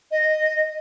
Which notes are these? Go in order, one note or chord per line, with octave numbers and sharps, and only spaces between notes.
D#5